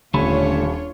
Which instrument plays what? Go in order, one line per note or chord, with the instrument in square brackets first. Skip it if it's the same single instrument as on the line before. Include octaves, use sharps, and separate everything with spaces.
[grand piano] D#1 B5 [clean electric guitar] D3 A3 C#4 [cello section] D4 F4 C#5